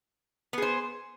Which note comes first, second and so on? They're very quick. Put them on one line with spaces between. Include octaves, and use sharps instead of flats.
B3 G#4 C5